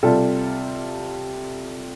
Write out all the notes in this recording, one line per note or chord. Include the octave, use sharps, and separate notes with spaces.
C3 G3 F4 A4